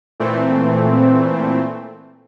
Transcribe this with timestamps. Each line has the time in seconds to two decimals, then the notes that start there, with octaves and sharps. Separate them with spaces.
0.20 A#2 E3 A3 C4